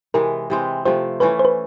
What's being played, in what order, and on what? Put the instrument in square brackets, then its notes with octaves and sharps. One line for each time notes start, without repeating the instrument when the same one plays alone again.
[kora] C3 E3 G#3 [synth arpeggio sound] A#4
[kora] C3 E3 G#3 C4
[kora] C3 F3 A3 [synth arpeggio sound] C5
[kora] E3 A3 C#4 [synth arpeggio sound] B4
[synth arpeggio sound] C5
B4